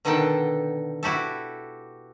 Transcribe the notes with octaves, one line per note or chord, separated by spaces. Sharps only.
B2 D3 D#3 A4 F#5 G5
E4 F#4 G4 A4